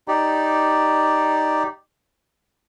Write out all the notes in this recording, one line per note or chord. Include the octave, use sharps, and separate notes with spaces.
D#4 G4 D5